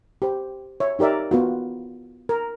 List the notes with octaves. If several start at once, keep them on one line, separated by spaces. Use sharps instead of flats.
G4 C5
C#5 E5
D#4 G4 A#4 D5 E5
B3 F4 F#4
A#4